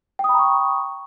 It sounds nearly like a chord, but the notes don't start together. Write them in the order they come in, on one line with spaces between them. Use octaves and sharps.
G5 D#6 B5 A#5 C#6